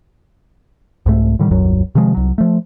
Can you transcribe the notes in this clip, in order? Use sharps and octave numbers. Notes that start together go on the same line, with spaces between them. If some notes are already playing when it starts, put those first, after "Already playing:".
C2 G#2 A3
A2 D3 D#3 G3
D#1 C2 F#2 F#3
C3 D#3 F3 G#3
C2 F#3
F3 A3